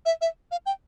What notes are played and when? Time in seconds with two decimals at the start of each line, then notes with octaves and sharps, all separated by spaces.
0.06 E5
0.21 E5
0.52 F5
0.66 G5